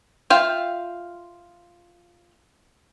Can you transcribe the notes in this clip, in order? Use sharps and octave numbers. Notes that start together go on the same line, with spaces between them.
F4 E5 F5 G5